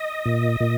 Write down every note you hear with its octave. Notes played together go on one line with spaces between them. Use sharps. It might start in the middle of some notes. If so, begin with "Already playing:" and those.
Already playing: D#5
A#2
A#2